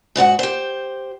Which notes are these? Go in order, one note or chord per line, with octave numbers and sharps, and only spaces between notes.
G#2 E4 F#4 F#5
G4 C5